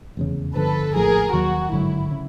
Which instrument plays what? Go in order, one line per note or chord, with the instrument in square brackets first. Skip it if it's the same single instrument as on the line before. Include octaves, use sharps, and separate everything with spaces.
[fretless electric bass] F1 E2 C#3
[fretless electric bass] G1 G2 D3 F3 [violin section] A4 B4
[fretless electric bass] A#1 A2 F3 [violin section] G#4 A#4
[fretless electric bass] D#2 D#3 F#3 [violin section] F#4
[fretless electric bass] G#1 G2 D3 F#3 [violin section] E4
[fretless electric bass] C#3